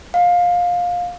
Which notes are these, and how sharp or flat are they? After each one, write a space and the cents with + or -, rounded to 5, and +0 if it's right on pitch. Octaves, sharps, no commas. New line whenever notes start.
F5 +20